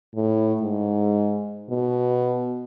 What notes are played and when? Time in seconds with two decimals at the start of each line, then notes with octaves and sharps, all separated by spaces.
0.15 A2
0.61 G#2
1.70 B2